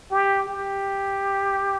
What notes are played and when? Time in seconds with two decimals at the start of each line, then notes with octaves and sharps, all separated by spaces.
0.11 G4
0.49 G4